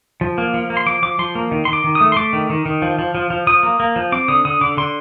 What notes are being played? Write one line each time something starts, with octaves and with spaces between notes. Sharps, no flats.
F3
A#3
F3
A#3
C6
F3 D6
F3 D6
F3 C6
A#3
D#3
D#3 C6
D6
D#3
D#6
A3
C6
A3 D6
D#3
D#3
D#3
F3
F3
F3
F3
F3 D#6
A#3
A#3
F3
C4 D6
D3 D#6
D3 D#6
D3 D6
D3 C6